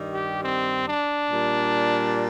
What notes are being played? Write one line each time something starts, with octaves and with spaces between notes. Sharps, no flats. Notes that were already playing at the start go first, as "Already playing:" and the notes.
Already playing: G2 D#3 G3
G4
C4
D4
A#2 G3